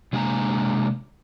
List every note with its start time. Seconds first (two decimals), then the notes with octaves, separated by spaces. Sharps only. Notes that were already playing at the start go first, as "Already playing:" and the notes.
0.13 C3 G#3 A#3 D4 G#5 A#5